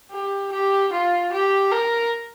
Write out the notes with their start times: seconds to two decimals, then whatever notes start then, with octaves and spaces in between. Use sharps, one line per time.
0.12 G4
0.52 G4
0.93 F4
1.32 G4
1.72 A#4